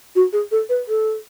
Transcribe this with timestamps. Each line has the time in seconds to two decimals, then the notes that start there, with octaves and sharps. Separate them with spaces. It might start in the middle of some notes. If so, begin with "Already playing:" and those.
0.16 F#4
0.33 G#4
0.52 A4
0.69 B4
0.88 A4